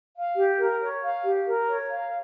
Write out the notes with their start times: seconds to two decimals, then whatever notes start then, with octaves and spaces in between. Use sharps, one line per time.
0.15 F5
0.36 G4
0.59 A#4
0.81 C#5
1.02 F5
1.23 G4
1.46 A#4
1.68 C#5
1.88 F5